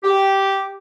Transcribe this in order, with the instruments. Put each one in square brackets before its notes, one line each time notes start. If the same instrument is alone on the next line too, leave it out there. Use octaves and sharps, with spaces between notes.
[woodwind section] G4